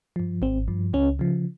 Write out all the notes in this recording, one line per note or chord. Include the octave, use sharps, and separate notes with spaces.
G2 F3
G#1 C4
G2 F3
C#2 C#4
C#3 F3